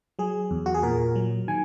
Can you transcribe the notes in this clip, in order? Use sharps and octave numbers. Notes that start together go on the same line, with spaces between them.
F#3 G#4
E2
F#4
G#4
A#2 A#4
F#3
D#3 G#5